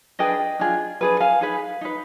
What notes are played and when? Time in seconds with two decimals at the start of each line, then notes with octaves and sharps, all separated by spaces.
0.19 D4 G#4 B4 D#5 G5
0.59 D4 F4 G#4
1.01 D4 G#4 B4
1.20 F5 G#5
1.41 D#4 G#4 B4
1.81 D#4 B4